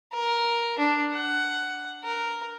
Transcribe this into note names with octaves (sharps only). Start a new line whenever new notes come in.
A#4
D4
F#5
A#4